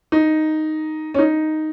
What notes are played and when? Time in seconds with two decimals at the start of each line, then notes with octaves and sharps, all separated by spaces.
0.12 D#4
1.14 C#4
1.18 D#4